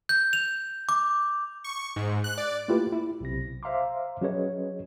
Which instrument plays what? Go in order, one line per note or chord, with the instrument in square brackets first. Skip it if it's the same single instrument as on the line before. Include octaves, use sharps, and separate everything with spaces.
[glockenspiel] G6
F7
D6
[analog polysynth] C#6
G#2
F#6
D5
[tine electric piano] A3 A#3 E4 F4 G4 B4
E4
B1 C3 A#6
C5 E5 F5 A#5 C6 D6
F#3 C#4 G#4 B4 C#5 D#5